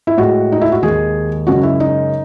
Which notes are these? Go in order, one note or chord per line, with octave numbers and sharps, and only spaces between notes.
E4
A2 G#3 F#4
D#4
E4
F#4
D#2 D#3 G#3 G#4
F#2 C#3 G#3 F#4
E4
D#4